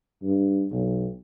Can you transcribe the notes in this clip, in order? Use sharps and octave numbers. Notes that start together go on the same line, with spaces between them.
G2
B1